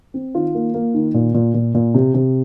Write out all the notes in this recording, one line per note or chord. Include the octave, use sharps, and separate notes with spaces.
C4
D#3 F4
A#3
A#3
D#3
A#2
A#2
A#2
A#2
C3
C3